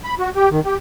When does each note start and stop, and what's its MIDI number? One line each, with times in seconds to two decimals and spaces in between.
0.04 0.15 83
0.20 0.29 66
0.36 0.49 67
0.51 0.60 51
0.65 0.77 67